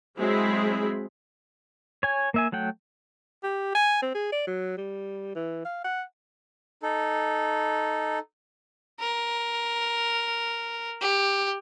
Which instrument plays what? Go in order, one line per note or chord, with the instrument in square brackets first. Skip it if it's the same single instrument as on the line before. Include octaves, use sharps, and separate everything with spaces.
[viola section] F#3 G#3 C4 E4 G#4 B5
[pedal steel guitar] C#5 G#5
A#3 E5 G#5
F#3 A3 F#5 G5
[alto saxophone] G4
G#5
C4
G#4
D5
F#3
G3
E3
F5
F#5
[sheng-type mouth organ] D#4 A4
[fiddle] A#4
G4